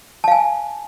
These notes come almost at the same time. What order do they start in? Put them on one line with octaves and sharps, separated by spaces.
A5 F5 G#5